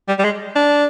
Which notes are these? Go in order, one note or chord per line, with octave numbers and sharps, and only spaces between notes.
G3
G3
G#3
D4